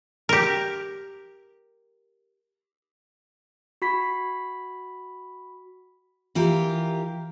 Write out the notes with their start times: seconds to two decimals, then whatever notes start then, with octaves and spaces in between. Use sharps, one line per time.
0.29 G4 A#4
3.82 F#4 B5 B6
6.35 E3 F4 G4 A#4